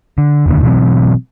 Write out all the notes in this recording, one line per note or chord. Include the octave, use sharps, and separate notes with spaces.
D3
F1 D#2 D3
B2 E3 F#3 C4